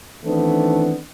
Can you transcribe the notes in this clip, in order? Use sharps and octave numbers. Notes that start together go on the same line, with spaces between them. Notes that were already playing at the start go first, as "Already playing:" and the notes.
D#3 E3 A3 B3 C4 D4